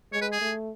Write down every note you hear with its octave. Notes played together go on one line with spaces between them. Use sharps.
G#3 C#5
B4
G#4
A3